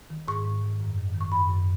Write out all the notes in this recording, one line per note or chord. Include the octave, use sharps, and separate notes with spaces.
D#3
G#2 C#6
G#2
D#3
F#2
D#3
D#3
C#6
F#2 B5
F#2